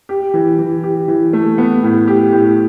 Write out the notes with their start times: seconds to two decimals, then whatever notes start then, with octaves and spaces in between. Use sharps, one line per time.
0.09 G4
0.34 E3
0.59 E3
0.83 G4
1.08 E3
1.33 A3
1.58 B3
1.83 A2
2.07 G4
2.33 A2